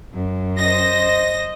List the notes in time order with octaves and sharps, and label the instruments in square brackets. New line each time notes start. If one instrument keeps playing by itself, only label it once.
[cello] F#2
[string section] C5 A#6 [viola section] D#5